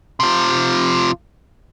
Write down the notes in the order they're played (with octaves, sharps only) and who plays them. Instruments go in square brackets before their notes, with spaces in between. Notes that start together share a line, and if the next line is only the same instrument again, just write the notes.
[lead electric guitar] C3 F3